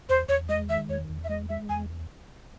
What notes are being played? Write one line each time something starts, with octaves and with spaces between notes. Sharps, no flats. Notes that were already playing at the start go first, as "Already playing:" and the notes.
E2 C5
E2 C#5
G#3 D#5
D#3 E5
E2 C#5
E2
E5
G#3 D#5
G#3 E5
E2 G#5